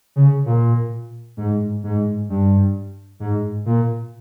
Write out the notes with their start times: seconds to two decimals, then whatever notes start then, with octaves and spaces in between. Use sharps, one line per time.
0.16 C#3
0.45 A#2
1.37 G#2
1.83 G#2
2.29 G2
3.20 G#2
3.66 A#2